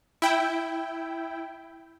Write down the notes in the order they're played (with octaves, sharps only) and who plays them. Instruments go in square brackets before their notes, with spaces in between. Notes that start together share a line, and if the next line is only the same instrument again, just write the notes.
[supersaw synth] E4 G5